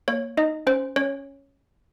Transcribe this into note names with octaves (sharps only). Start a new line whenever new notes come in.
A#3 C#5
D#4 D#5
C#4 C5
C#4 C#5